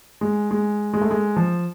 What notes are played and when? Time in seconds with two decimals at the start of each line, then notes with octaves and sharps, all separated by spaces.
0.21 G#3
0.51 G#3
0.93 G#3
1.01 A3
1.11 G#3
1.36 F3